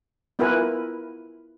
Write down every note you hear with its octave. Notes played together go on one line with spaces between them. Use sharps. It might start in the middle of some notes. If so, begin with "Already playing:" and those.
B3 E4 F4 A#4 B4 G#5